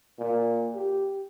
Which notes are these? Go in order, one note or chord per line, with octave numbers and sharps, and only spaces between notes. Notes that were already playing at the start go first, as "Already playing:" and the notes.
A#2
G4